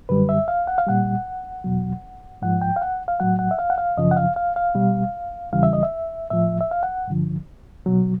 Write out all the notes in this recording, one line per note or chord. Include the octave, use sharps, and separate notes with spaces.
F#2 D3 G3 B4
E5
F5
F#5
F5
A#2 G3 F#5
E2 B2 F#3
G#2 F3 F#5
G5
F5
F#5
F5
A2 F#3 F#5
F#5
E5
F5
F#5
F5
F#2 C#3 F3 D#5
F#5
F5
F5
F5
B2 G3
E2 C#3 E3 G3 F5
E5
D#5
E5
A2 F3 E5
E5
F5
F#5
G2 D3 F3
B2 F#3